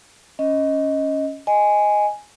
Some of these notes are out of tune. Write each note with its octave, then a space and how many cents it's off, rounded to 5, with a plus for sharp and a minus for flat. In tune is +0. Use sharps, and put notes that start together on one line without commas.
C#4 +0 D#5 +10
D#5 +0 G#5 +0